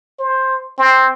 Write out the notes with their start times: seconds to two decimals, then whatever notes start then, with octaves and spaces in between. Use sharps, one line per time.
0.19 C5
0.79 C4